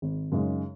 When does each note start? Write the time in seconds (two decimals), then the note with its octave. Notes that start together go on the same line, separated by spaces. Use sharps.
0.02 G#1
0.32 F#2 C#3 G#3 D#4